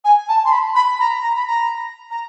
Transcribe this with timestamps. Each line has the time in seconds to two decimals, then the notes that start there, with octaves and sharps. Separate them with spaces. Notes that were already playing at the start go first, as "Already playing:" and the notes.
0.04 G#5
0.28 A5
0.45 C6
0.52 B5
0.75 B5
1.00 A#5
1.23 A#5
1.36 B5
1.47 A#5
2.11 A#5